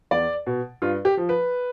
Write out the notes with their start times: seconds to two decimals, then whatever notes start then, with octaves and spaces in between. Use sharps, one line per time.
0.11 E2 D5
0.46 B2
0.82 G2 F4
1.05 G4
1.17 F3
1.29 B4